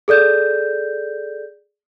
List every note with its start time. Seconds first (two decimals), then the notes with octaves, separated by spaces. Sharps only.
0.08 G#4 A4 D5 G6